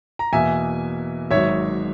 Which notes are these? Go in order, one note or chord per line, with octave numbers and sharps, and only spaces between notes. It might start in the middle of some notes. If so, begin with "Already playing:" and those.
A#5
E2 B2 A#3 E5 G#5
G#1 G#2 F#3 C#5 E5